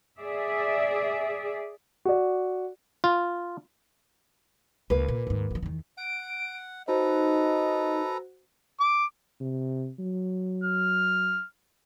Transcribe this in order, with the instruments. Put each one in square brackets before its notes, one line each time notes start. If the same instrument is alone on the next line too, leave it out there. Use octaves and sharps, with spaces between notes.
[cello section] G#4 D5 E5
[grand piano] F#4 D5
[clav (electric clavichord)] F4
[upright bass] C#2 [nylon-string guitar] A#3 B4
[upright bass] A#2
D#2 G#2
F3 F#3
E2 D#3
[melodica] F#5 [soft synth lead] D7
[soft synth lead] D#4 [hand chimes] F#4 C5 [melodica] A4 B4 A#5 [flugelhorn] D#5
[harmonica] D6
[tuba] C3
F#3
[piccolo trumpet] F6